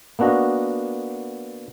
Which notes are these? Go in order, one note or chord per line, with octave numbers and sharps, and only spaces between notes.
A#3 B3 D4 F#4 D#5